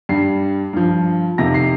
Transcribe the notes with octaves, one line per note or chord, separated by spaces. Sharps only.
G2 G3 C7
G2 F3
F2 C3 D#3 A#6
C7